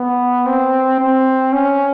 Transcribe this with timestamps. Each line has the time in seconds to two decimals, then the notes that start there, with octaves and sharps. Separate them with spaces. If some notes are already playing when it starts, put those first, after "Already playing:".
Already playing: B3
0.46 C4
1.00 C4
1.53 C#4